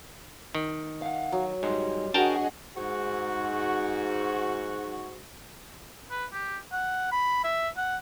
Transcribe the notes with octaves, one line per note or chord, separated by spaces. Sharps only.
D#3
F5 F#5
F#3
G#2 G3 D#5 C6
D4 F#4 G#4 A#4 D#5 G5 A5
G#2 F#4
B4
G4
F#5
B5
E5
F#5